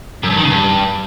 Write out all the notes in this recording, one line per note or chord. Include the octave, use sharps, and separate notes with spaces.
F#2
G2
D#3
C#3
G2